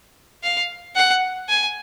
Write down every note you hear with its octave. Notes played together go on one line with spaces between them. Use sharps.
F5
F#5
G#5